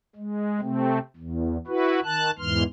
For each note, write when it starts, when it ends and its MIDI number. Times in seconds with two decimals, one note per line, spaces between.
0.16 0.61 56
0.61 0.99 48
0.61 0.99 57
0.61 0.99 60
1.16 1.57 40
1.67 2.00 64
1.67 2.00 66
1.67 2.00 71
2.04 2.31 51
2.04 2.31 81
2.04 2.31 90
2.38 2.63 40
2.38 2.63 44
2.38 2.63 52
2.38 2.63 84
2.38 2.63 89